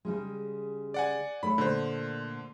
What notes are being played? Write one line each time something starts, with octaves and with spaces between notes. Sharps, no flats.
C#3 G3 G#3
D5 F#5 G#5
A3 C#5 B5
A#2 D3 A3 C5